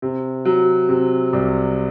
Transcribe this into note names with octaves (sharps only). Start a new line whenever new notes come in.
C3
F#3
C3
C2